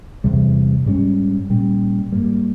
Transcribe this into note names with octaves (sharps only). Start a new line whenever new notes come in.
E2 C3 G3
G#2 G3 C#4
A#2 G3 C#4
G#2 G3 A#3